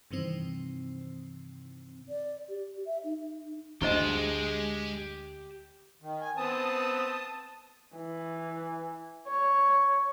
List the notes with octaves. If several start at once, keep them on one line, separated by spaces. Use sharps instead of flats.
G2 C3 D#3 E3 C4
D5
G4
E5
D#4
D2 G#3 E4 G4 C5 D#5 A5 C6
D#3
G#5
B3 C4 A5 D#6
E3
C#5